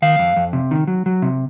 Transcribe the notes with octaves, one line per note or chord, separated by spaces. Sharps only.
D#3 F5
F2
F2
C3
D#3
F#3
F#3
C3